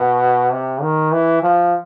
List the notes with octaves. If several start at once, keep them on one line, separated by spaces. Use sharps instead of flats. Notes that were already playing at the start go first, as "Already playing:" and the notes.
Already playing: B2
C3
D#3
E3
F3